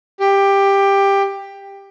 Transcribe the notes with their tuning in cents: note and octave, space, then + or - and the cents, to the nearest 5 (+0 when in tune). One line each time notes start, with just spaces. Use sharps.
G4 +15